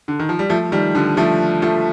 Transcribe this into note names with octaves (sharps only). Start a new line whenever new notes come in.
D3
D#3
F3
G3
F3 A3
D#3 G3
D3 F3
F3 A3
F3 A3